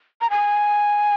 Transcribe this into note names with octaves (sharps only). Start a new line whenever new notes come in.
A#5
G#5